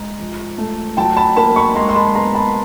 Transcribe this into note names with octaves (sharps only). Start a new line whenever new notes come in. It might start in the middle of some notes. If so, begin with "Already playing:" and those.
Already playing: G#3 A#5
F3
A3
F#3 G5 A5
A5 B5
A#3 A5 B5
B5 C#6
G#3 A#5 C6
C6
A5 B5
B3 A#5 C6
A5 B5